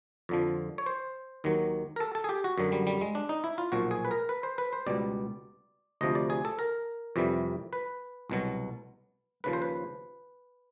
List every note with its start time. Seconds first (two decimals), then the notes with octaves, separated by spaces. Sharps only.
0.29 F2 D3 F3
0.78 C#5
0.86 C5
1.44 D#2 D#3 F#3
1.96 A#4
2.00 A4
2.15 A4
2.24 G#4
2.29 G4
2.44 F#4
2.58 F#2 D3 F#3
2.72 G3
2.87 G3
3.01 G#3
3.15 D4
3.29 D#4
3.44 E4
3.58 F4
3.72 B1 A#2 F3 F#4
3.91 G#4
4.05 B4
4.11 A#4
4.29 B4
4.43 C5
4.58 B4
4.73 C5
4.86 C#2 B2 G3 D5
6.01 D2 C3 F3 D#5
6.15 D5
6.30 G#4
6.45 A4
6.59 A#4
7.16 F2 C3 E3 G3
7.73 B4
8.30 C2 B2 F#3
9.44 D#2 C#3 F3 B4
9.53 C5
9.62 B4